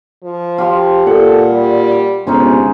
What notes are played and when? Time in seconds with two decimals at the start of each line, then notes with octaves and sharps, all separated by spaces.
0.24 F3
0.58 F4 G4 C6
1.07 A#2 A4 F#5
1.50 G3
2.27 G1 C3 G#3 C#4 D#4